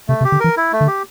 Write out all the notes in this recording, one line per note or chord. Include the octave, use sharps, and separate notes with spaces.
C3 A3
C3
G4
D3
E3 A#4
E4
A3
D3
G4